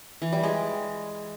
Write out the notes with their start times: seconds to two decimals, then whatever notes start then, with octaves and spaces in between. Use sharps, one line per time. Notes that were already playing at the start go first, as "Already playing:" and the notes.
0.22 E3
0.33 G3
0.43 G#3